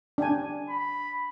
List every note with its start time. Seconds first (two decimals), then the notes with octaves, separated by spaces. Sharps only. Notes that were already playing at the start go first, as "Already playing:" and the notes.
0.18 D4 G5 G#5
0.69 B5